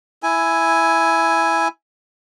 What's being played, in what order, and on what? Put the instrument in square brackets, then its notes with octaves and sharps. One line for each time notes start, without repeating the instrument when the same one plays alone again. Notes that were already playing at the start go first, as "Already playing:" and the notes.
[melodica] E4 G#5